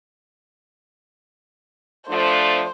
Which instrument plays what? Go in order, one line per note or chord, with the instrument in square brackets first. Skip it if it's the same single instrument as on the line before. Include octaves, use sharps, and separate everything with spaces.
[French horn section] F3 A3 D4 [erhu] C5